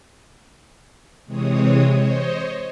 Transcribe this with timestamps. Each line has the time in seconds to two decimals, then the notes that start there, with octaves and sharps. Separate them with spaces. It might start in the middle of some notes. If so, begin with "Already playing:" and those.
1.26 C3 E3 G#3 C4 C#5 D#6
1.91 C5 C#5 D#5